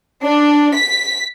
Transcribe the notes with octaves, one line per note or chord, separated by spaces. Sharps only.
D4
B6